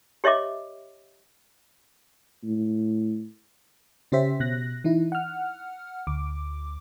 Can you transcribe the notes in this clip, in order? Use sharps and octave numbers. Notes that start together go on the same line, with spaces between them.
G4 C#5 D#5 E5 D6
A2
C#3 C#4 G4 C5 E5 B6
B2 F#6 A#6
E3 D#4 E4
F#5 F6
D2 D6